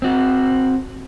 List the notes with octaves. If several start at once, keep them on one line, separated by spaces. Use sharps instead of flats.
C4 F#4